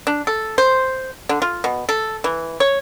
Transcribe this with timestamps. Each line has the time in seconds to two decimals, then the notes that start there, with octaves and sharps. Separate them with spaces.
0.07 D4
0.27 A4
0.58 C5
1.29 D3
1.42 F4
1.64 B2
1.89 A4
2.24 E3
2.60 C#5